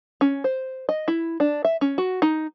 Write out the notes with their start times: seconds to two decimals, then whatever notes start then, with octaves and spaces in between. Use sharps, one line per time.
0.21 C#4
0.44 C5
0.89 D#5
1.08 E4
1.40 D4
1.65 E5
1.81 C#4
1.98 F#4
2.22 D#4